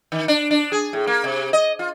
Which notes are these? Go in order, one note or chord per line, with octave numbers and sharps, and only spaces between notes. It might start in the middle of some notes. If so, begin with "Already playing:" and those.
D#3
D4
D4
G#4
A2
A#3
C3
D#5
F4